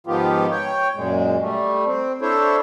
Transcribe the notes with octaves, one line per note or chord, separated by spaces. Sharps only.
G#2 D#3 F3 B3 F4 G4
C#5 G5
F#2 A#2 G#3
G3 A3
C4
D4 E4 A4 C5 C#5